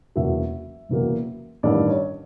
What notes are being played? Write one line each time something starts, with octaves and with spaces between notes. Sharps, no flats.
E1 E2 C#3 F#3 A#3 E5
E1 E2 C#3 F#3 A#3
A1 G2 D#3 D5
C#5